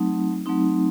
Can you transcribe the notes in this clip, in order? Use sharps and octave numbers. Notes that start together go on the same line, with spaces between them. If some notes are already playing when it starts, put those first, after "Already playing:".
Already playing: F#3 A3 C4 D#4
F#3 A3 C4 D#4